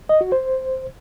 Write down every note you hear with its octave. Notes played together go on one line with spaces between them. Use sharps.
D#5
F#4
C5